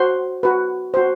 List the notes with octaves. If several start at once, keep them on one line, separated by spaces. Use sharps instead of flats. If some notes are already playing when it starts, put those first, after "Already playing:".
Already playing: F#4 C5 C6
F#4 B4
F#4 C5